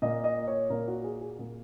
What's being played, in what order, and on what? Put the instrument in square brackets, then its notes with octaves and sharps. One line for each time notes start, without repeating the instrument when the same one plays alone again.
[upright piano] A#2 A#3 D#5
D#5
C#5
A#2 A#3 A#4
F#4
G#4
G#4
A#2 A#3